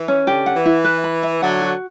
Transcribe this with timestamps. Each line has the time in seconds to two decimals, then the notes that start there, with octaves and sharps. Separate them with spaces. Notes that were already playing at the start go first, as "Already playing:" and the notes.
Already playing: E3
0.08 C#4
0.27 D3 G4
0.46 F#5
0.56 E3
0.66 E4
0.84 B4
1.04 B5
1.23 E5
1.41 D3 F#3 F#5
1.61 F#4